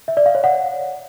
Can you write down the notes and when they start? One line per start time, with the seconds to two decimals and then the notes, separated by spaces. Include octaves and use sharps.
0.08 E5
0.17 D5
0.26 F5
0.35 C#5
0.44 F#5